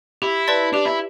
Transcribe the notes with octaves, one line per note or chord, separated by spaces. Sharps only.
E4 G4
B4 D5 A5 C6
D4 G4
E4